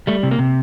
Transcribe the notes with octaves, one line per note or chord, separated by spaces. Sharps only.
G3 A3
C3
A#3
C3